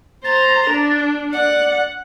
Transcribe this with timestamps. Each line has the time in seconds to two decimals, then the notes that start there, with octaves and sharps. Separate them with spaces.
0.25 C5 A#5 A6
0.70 D4
1.33 D5 F#5